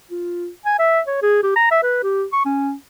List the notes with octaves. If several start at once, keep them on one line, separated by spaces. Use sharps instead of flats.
F4
G#5
E5
C#5
G#4
G4
A#5
E5
B4
G4
C#6
C#4